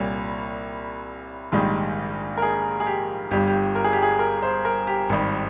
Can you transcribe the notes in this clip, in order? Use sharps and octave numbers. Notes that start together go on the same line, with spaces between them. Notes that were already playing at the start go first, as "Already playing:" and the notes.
Already playing: C2 A#2 G3 C#5
A#1 G#2 D#3 G3
A#4
G#4
G#4
G4
G1 G2 G3 G4
G4
A#4
G#4
G4
G#4
A#4
C5
A#4
G4
G#1 G2 D#3 G3